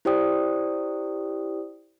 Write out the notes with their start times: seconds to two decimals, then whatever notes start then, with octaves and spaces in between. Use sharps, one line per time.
0.05 E4 G4 C5 D5 G5 D#6